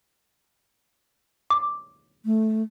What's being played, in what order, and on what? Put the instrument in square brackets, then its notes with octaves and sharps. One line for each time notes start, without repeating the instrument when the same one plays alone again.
[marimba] D6
[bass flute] A3